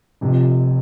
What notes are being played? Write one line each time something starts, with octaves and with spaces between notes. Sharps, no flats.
F1 F2 C3